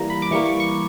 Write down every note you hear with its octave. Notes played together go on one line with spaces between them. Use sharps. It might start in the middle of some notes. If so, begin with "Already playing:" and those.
Already playing: E3 G3 A#3 A#5
B5
D6
E3 G3 A#3 C#6
C#6
C#6